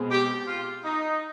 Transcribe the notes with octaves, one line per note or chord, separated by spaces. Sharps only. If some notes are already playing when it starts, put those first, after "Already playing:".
Already playing: B2 G#3 C4
G4
F4
D#4